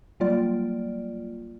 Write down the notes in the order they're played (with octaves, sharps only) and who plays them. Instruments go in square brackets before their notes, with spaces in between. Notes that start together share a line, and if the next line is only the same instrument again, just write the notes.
[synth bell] F#3 G3 A#3 F4 D5